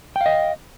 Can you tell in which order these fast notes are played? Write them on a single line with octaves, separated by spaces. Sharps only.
G5 F5 D#5